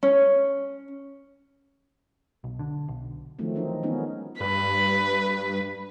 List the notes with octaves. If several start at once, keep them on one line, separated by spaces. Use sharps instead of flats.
C#4
B1
D3
B1
D#3 F3 F#3 A3 C4
E3 C4 D#4
D#3 G#3 B3 C#4 D#4
G2 B4